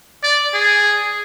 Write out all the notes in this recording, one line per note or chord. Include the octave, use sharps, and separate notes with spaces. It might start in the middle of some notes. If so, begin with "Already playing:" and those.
D5
G#4